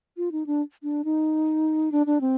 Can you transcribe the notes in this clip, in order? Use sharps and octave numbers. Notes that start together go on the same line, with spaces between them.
F4
D#4
D4
D4
D#4
D4
D4
C4